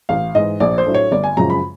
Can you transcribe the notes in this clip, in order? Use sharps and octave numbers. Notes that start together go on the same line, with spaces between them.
A1 F5
G#2 E3 D#5
A#1 D5
C5
A2 F#3 A3 D4
C#5
G1 D5
G#5
F#2 C#3 F3 G#3 A#5
B5